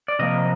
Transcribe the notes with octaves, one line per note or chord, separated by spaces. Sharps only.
D5
C3 F3 A#3 D#5